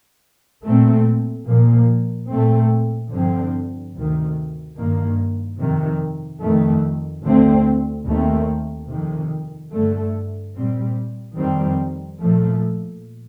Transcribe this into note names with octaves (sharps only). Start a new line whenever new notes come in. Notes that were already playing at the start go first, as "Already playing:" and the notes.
A#2 A3 C4
A#2 F3 A#3
A#2 A3 C4
G2 D3 F3 C4
D2 C3 D#3
G2 D#3 A#3
F2 C3 D#3
F2 D#3 A3
D2 D3 A3 C4
D#2 D#3 A3 C4
F2 C3 D#3
G2 D3 A3
A#2 G3 C4
F2 D#3 G3 C4
A#2 F3 A3